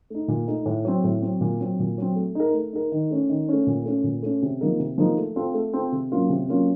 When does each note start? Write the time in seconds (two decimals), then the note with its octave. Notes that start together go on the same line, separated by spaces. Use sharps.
0.10 A3 D#4
0.28 A#2
0.48 A3 D#4
0.66 A2
0.85 F#3 C4
1.04 A2
1.22 F#3 C4
1.41 A#2
1.61 F#3 C4
1.79 A#2
1.98 F#3 C4
2.16 A3
2.35 D#4 A#4
2.53 A3
2.73 D#4 A#4
2.92 D#3
3.11 A3 C#4
3.30 D#3
3.49 A3 C#4
3.67 A#2
3.85 A3 C#4
4.04 A#2
4.23 A3 C#4
4.43 C3
4.61 F3 A#3 D#4 A#4
4.79 C3
4.98 F3 A#3 D#4 A#4
5.17 A3
5.36 C4 F4 A4
5.54 A3
5.74 C4 F4 A4
5.92 C3
6.12 F#3 A#3 C#4 F4
6.29 C3
6.49 F#3 A#3 C#4 F4